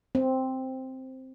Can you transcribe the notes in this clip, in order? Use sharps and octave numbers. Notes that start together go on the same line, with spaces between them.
C4